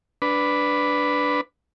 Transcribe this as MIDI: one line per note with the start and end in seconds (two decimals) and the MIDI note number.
0.22 1.41 62
0.22 1.41 71